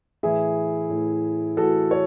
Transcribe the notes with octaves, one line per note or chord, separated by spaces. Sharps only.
A2 E3 E4 G#4
A2 E3
A2 E3 F#4 A4
C#5